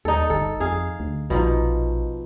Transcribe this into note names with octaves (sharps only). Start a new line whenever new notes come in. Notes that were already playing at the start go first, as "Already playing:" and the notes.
D#2 D#4 A4
G1 A4
F2 G#4 F5
D2
A#1 B2 F3 D#4